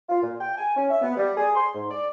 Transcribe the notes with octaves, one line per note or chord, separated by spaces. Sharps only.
F4
A#2
G5
G#5
C#4
E5
B3
G3
G#4
C6
G#2
D5